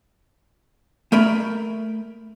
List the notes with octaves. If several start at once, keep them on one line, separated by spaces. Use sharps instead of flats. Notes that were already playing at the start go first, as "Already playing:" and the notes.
A3 A#4 B5